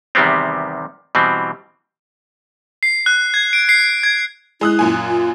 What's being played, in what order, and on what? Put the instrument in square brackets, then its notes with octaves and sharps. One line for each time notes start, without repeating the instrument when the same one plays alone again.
[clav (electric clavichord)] E2 C3 D#3 G3 B3 C4
B2 E3 G3 C4
[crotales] C7
F#6
G#6
D7
C7
G#6
[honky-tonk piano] G#3 D#6 F#6 [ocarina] E4
[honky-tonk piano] F#2 A#2 G#5
[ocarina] F4